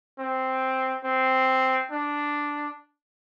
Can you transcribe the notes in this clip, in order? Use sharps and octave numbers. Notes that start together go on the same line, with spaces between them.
C4
C4
D4